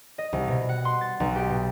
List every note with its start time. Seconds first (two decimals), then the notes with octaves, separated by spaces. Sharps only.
0.18 D#5
0.33 C2
0.48 B2
0.69 F#5
0.85 C6
1.01 A6
1.20 B1
1.36 G4
1.50 B2